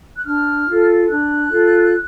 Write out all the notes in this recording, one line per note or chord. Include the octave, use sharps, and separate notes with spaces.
F#6
D4 F6
F4 A4
D4 F#6
F4 A4